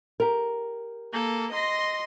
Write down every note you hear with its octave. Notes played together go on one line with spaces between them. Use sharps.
G4 A#4
A#3 A4
D#5 C6 A#6